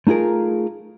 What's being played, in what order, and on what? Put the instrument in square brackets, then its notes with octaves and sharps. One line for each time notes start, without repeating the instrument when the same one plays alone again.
[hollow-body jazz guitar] A3 D#4 F4 G#4 A#4